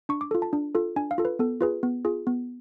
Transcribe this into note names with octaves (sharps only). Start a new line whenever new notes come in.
D4 C#6
D6
F4 A4
A5
D4
F4 A4
D4 G#5
F5
F4 A4
B4
B3 A4
F4 G#4 B4
B3
F4 G#4
B3